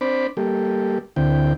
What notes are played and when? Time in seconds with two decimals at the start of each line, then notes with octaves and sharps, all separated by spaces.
0.01 C4 D4 C5 B5 D6
0.37 G3 A#3 G4 A4
1.16 D2 D3 C4 E4 G5